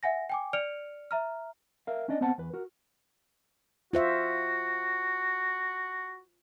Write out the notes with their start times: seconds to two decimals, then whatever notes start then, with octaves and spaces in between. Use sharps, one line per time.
0.03 E5 F#5 G#5 A#6
0.30 G5 G#5 D6
0.53 D5 F6 C#7 D7 F7
1.11 E5 A#5 F6
1.87 A#4 E5 F5
2.09 C#4 D4 D5 D#5
2.21 B3 C4 C5 F#5 A5
2.38 E2 B4
2.53 F#4 A#4
3.93 F4 F#4 C5 E5